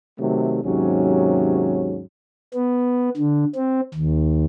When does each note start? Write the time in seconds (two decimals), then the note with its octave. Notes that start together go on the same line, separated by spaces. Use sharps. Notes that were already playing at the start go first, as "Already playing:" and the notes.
0.19 C3 D#3 F#3 A3
0.63 D#2 G#2 C3 F#3 C#4
2.54 B3
3.17 D3
3.56 C4
3.94 D#2